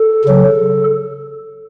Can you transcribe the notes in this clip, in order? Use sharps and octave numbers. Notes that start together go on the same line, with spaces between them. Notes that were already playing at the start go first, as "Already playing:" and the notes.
Already playing: A4
C#3 F#3